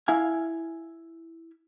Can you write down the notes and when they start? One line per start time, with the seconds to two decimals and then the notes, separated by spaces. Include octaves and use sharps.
0.08 E4 F5 G#5